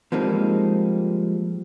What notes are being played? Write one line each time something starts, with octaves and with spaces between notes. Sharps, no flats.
F3 G3 G#3 A#3 C4 D#4